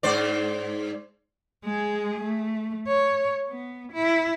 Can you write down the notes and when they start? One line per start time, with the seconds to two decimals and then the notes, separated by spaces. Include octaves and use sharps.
0.03 G#2 C5 D5
1.64 G#3 G#4
2.22 A3
2.87 C#5
3.49 B3
3.92 E4